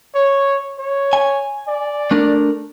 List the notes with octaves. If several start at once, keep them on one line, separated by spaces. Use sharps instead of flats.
C#5
C#5
G#5
D5
A3 D4 A#4